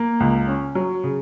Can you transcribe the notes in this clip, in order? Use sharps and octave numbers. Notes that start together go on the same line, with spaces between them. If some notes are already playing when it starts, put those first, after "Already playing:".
Already playing: A#3
C#2
C#4
F#3
C#3